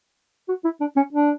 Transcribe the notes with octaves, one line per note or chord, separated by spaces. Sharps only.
F#4
E4
D4
C#4
D4